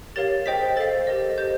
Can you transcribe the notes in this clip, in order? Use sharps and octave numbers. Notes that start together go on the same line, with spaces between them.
G4 A#4 C#5 F5 A6
G#4 C5 D#5 G5 B6
A4 C5 F5 A6
G4 A#4 D#5
G4 C5 D#5 G6